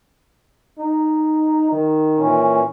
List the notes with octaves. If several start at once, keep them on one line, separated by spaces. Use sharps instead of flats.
D#4
D#3
A#2 E3 C#4